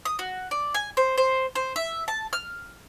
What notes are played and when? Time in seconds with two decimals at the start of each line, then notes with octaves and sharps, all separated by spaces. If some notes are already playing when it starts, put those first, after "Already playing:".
0.05 D#6
0.19 F#4
0.51 D5
0.74 G#5
0.97 C5
1.18 C5
1.55 C5
1.76 E5
2.08 A5
2.33 F6